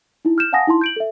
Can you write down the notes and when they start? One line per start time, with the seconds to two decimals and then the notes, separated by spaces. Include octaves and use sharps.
0.25 D#4 E4
0.38 F6 G6 E7
0.53 F5 F#5 G#5 A5 D#6 A#6
0.67 D#4 E4 A5 C6
0.81 G6 D7 F#7
0.96 A4 E5